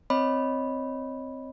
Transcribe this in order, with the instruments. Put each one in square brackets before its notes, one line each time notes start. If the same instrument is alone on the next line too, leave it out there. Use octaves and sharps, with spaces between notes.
[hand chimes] C4 C#5 D#5 B5